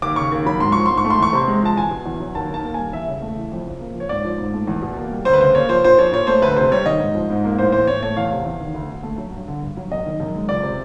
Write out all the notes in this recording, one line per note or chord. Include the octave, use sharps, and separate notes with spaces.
D#2 D6
C#3 C#6
D#2
F#3 B5
G#2 C6
F3 C#6
G#2 C6
C#6
A3
C6
E2 C#6
C3 C6
G#3
F3 A5
E2 G#5
B2
E2
F#3
D#2 A5
D#3 A5
A#3
G3 G#5
E2 E5
C#3
A3
E3
F2
C#3
A#3
F3
C#5
G#2 D5
F3
G#2
A3
E2
B2
A#3
G3
D2 C5
B4
C#3 C5
A#3 C#5
F3 C5
A#2 C5
F3 C#5
A#2 C#5
A3 C5
D2 B4
C3 C5
G3 C#5
D#3 D#5
G#2
F3
G#2
A#3
A2 C5
E3 C5
A2 C#5
A3 C#5
E2 F5
C3
E2
D#3
D2
D3
A3
F#3
G2
D3
G2
F#3
F#2 D#5
D#3
F#2
G#3
C#2 D5
C3